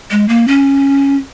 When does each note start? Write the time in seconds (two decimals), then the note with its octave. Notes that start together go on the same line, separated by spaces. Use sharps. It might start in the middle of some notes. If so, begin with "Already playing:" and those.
0.11 G#3
0.29 A#3
0.48 C#4